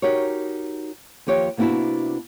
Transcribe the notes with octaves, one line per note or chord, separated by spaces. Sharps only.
D#4 F#4 G4 A#4 C#5
D#2 F3 G4 C#5 G5
C3 A#3 B3 D4 E4 F#4